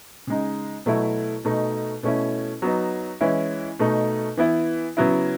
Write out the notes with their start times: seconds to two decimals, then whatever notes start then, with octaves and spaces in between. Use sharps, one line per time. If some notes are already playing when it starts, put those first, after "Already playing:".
0.27 C#3 G#3 D#4
0.86 B2 F#3 A3 E4
1.45 B2 A3 D#4
2.03 B2 A3 C#4 E4
2.62 F#3 B3 D#4
3.21 E3 G#3 C#4 E4
3.79 B2 A3 D#4
4.37 E3 B3 E4
4.97 C#3 F#3 B3 E4